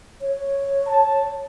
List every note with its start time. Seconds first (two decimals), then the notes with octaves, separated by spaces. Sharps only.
0.21 C#5
0.87 A5